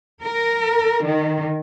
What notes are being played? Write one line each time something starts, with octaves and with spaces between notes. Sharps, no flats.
A#4
D#3